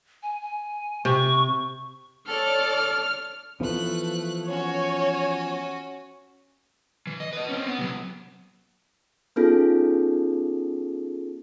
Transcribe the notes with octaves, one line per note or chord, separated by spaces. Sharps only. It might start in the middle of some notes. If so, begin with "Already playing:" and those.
G#5
G#5
C3 C#6
A4 C#5 D5 F6
E3 F3 A3 B3 F#6
C#4 F#4 C#5
E3
D#5
B4 D#5
C4 C#4
B3
C3 F#3
B3 C#4 D#4 F4 G#4 A4